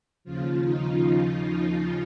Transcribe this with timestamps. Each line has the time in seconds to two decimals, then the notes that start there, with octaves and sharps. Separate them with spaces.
0.24 D#2 C#3 F3 F4
0.64 D#4
1.04 F4
1.43 F4